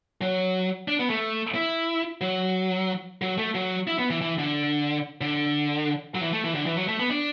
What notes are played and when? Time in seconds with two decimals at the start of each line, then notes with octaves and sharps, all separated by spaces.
0.21 F#3
0.88 D4
0.99 B3
1.10 A3
1.55 E4
2.21 F#3
3.22 F#3
3.38 A3
3.55 F#3
3.87 E4
3.99 B3
4.10 E3
4.21 E3
4.39 D3
5.21 D3
6.15 F#3
6.21 E3
6.33 A3
6.44 E3
6.55 D3
6.66 E3
6.77 F#3
6.88 A3
7.00 B3
7.11 D4